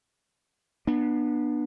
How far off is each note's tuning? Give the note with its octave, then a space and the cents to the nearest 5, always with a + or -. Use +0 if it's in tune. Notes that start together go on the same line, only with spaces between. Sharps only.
B3 -30 D4 +30